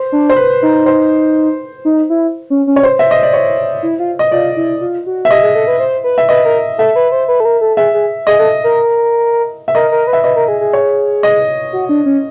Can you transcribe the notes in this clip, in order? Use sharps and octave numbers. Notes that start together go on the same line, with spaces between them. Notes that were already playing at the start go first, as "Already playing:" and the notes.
Already playing: C5
D4
C5
B4
D#4
C5
D#4
E4
C#4
C#4
C#5
C5
E5
D#5
D5
C#5
E4
F4
D#5
F4 D5
E4
F4
F#4
E5
G4 D#5
G#4
A4
B4
C5
B4
E5
B4 D#5
A#4
A4 E5
B4
C5
B4
A4
A#4
A4
G#4 E5
G#4
G#4 D#5
A4
A#4
E5
A#4 D#5
A#4
B4
E5
B4 D#5
A#4
G#4
G#4
C#5
D#5
F#4
D4
C#4